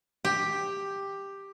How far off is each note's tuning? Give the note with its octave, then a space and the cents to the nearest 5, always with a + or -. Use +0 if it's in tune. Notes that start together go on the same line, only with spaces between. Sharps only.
G4 +5